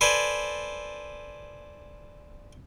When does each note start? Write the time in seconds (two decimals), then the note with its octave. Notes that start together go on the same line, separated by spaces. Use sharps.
0.01 A4 B4 C5 D5 G#5